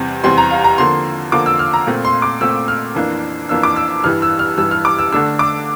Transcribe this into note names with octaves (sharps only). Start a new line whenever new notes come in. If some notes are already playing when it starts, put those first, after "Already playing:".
Already playing: E2 C3 G3 C4
E2 C3 G3 C4 C6
A#5
F5
A#5
D3 F3 A#3 C6
D3 F3 A#3 D6
E6
F6
A#5
A#2 A3 C4
C6
D6
A#2 A3 C4 E6
F6
F2 E3 A#3 D4
F2 E3 A#3 D4 E6
D6
E6
G2 E3 G3 F6
E6
F6
G2 E3 G3 E6
F6
D6
E6
D3 A3 D4 E6
D6